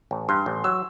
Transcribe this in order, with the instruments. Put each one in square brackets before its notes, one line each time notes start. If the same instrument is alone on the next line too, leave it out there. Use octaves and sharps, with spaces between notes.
[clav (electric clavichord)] A1
[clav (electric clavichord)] G2 [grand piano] C6
[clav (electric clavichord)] A1
[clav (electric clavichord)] F#3 [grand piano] E6